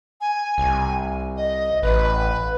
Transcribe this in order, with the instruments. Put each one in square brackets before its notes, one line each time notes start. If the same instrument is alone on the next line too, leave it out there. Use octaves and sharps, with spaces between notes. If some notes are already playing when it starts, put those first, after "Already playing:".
[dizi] G#5
[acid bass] C2
[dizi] D#5
[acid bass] A1 [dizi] B4